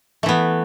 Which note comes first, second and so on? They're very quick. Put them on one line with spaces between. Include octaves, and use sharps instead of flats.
A3 E3 B3